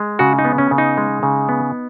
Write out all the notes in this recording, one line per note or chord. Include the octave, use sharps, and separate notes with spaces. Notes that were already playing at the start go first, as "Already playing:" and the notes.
Already playing: G#3
C#3 F#4
D#4
B3
C#4
C#3
D#4
G#3
C#3
B3